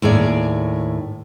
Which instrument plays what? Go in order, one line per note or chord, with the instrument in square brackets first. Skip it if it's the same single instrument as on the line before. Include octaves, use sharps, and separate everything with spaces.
[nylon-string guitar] D#2 A2 G#4 D5